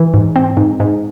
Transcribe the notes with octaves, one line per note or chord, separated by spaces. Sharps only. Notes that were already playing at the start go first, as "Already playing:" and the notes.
Already playing: E3
G#2
C4
G#2
G#2